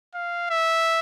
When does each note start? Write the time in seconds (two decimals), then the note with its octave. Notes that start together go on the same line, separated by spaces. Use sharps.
0.14 F5
0.50 E5